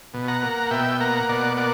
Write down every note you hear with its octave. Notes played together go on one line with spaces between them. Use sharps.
B2
F#5 A#5
A#3
F#5
B2 E5 G5
A#3 F#5 A#5
B2 D5 F#5
A#3 D5 F#5